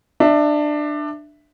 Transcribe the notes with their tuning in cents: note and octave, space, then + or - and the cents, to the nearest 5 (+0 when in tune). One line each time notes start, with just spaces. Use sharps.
D4 +20 E5 +0